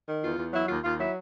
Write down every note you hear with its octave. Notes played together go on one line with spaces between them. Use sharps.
D#3
E2 F4
E2
F#3 E4
D#2 F4
D#2 F4
F#3 E4